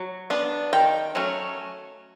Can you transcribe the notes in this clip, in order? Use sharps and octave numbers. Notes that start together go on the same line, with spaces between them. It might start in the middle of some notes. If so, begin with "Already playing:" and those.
Already playing: F#3
B3 D4
D#3 G5
F#3 A3 C#4